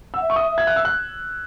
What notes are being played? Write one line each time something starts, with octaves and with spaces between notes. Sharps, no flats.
F#5 E6
E5
C#6
D#6
E5
G#6
F#6
E6
F#6